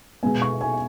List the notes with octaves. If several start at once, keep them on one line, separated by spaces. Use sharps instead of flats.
B2 G#3 B3 G#5
C#6
G#5